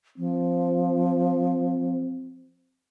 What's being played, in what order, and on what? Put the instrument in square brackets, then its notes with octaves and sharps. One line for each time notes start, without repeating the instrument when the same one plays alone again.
[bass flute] F3 [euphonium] C4